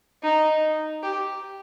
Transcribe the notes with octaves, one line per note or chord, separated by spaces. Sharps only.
D#4
G4